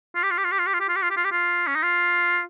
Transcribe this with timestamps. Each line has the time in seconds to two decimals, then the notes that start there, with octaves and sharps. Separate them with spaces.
0.15 F4
0.23 G4
0.31 F4
0.38 G4
0.44 F4
0.52 G4
0.59 F4
0.67 G4
0.74 F4
0.80 G4
0.89 F4
0.96 G4
1.02 F4
1.10 G4
1.17 F4
1.25 G4
1.31 F4
1.67 C#4
1.75 D#4
1.83 F4